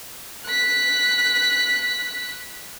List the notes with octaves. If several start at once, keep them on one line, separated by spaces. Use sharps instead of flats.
F#6 B6